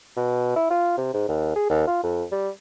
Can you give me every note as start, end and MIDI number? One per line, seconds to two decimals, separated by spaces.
0.17 0.54 47
0.56 0.70 64
0.70 0.94 65
0.98 1.11 48
1.14 1.26 44
1.29 1.56 39
1.56 1.70 68
1.70 1.82 39
1.88 2.01 65
2.03 2.24 41
2.32 2.49 55